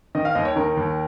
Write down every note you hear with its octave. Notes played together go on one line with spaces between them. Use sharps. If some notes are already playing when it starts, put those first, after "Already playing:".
D#3 D#5
F5
D#2 D#5
C#5
D#3 A#4
D#2